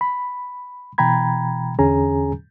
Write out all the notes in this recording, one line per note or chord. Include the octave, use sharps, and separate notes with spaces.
B5
B2 E3 G5 A#5 B5 G#6
E2 D3 C#4 G#4 G#5 A#5